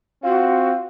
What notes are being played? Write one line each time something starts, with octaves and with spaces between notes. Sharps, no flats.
C4 F4 F#4